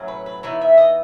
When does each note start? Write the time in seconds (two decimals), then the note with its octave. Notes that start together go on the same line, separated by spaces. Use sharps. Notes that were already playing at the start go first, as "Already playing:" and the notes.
Already playing: A2 F#3 C#4
0.08 B4
0.26 B4
0.43 E3 B3 D#4 C#5
0.61 E5
0.78 D#5